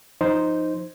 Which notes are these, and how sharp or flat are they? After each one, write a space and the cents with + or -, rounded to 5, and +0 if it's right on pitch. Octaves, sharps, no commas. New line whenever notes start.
F3 +0 D#4 +0 C5 +0